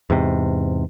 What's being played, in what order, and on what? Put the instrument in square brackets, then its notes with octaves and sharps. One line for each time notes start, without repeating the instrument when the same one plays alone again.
[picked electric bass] E2 G#2 C3